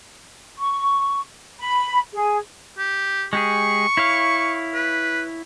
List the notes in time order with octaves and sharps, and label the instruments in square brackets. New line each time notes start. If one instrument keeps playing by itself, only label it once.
[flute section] C#6
B5
G#4
[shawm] G4
[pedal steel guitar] G#3 G4 G#4 [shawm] C#6
[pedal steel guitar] E4 C#5 F5
[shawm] B4